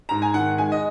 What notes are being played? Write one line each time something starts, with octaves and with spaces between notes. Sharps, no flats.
G#2 A#5
G#5
D#3 F#5
G#3 G#5
D#5